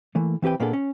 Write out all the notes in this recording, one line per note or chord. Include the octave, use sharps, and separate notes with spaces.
E3 A3 A#3
E3 C4 G4 B4 G5
A#2 A#3 B3 D4 G#4 A4
C#4